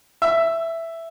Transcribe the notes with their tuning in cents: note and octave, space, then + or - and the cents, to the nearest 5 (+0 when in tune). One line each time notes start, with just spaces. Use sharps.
E5 +5